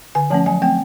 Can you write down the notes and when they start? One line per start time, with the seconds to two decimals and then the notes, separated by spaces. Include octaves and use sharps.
0.15 D3 G#5
0.30 F3 A3 C#4 A5
0.46 F#3 G#5
0.62 A3 C4 G5